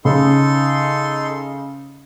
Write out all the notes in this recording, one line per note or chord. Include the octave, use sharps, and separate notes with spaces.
C#3 D#4 A4 C6